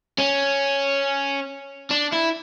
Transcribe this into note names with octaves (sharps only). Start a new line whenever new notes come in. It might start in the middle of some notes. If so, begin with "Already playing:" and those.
C#4
D4
E4